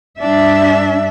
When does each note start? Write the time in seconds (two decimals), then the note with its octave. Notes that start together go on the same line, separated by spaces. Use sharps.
0.19 G2 D4 E5